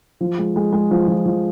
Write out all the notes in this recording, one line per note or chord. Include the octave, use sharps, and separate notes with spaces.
F3
G#3
G#3
G#3
F3
F3
F3